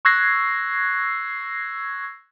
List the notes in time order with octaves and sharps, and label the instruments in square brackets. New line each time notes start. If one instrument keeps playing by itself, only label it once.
[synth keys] C#6 E6 F#6 G#6 A#6 C7